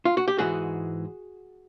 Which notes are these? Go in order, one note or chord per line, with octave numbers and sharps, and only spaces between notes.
F4
F#4
G4
G#2 E3 G#3 F#4 G#4